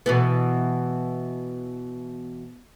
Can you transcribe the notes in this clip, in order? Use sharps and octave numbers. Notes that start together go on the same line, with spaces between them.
B2 E3 B3